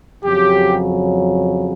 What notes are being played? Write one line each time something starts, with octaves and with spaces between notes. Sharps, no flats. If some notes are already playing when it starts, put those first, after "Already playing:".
F2 C#3 F#3 G4